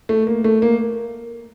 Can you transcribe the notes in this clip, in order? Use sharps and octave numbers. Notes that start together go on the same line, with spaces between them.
A3
A#3
A3
A#3